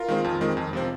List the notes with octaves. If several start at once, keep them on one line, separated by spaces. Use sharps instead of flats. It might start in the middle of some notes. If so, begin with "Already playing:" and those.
Already playing: F4 A#4
D#3 G#3 C4
F2
D#3 G#3 C4
F2
C3 F3 C4